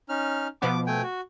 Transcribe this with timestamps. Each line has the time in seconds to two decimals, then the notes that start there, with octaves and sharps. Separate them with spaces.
0.09 C#4 D#4 F6
0.62 B2 F3 B3 D6
0.87 A3 G5 G#5
1.03 F#4